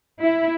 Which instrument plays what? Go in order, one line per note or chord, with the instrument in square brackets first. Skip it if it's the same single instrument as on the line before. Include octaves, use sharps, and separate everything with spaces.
[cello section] E4